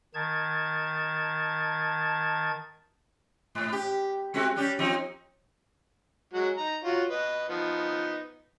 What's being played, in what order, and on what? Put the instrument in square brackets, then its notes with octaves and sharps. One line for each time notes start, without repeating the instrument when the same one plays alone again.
[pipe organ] D#3 A5 G#6
[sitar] G#2
G4
G#3 C4 F#4
G3 C#4 G4
F3 C4 D#4
[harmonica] F#3 G#3 F#4
D#4 A#5
F4 F#4 C#5
B4 D#5
F3 B3 D#4